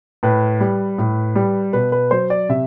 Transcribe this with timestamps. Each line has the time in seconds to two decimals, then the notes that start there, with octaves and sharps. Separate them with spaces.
0.23 A2 B4
0.60 G3
0.98 A2
1.35 G3
1.73 B2 B4
1.92 B4
2.11 F#3 C5
2.30 D5
2.49 C3 E5